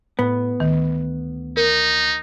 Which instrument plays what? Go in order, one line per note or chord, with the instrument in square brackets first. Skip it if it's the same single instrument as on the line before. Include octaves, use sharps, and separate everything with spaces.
[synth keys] A2 [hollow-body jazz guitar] B3
[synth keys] D2 [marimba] D#3
[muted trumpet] D#4 [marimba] A#4